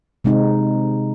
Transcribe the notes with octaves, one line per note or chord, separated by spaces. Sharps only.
C3 G#3 C4 D#4